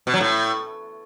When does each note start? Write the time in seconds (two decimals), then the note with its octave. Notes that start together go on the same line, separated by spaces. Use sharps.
0.07 B2
0.14 F#3
0.20 A2